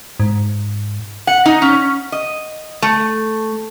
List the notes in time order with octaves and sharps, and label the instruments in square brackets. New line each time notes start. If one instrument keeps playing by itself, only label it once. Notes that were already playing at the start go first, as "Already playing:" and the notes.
[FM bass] G#2
[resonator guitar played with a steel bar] F#5
D#4
C#4
D#5
A3